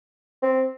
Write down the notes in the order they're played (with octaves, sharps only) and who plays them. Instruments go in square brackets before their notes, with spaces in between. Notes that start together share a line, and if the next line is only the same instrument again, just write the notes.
[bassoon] C4